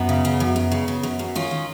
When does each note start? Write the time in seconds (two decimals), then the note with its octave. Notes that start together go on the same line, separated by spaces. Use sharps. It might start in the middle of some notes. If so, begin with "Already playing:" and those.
Already playing: F#2 B3 D#4
0.09 C#3
0.25 C#3
0.40 F#2
0.56 F#2
0.72 C#3
0.88 C#3
1.03 F#2
1.19 F#2
1.35 D#3 C#4 F4
1.51 D#3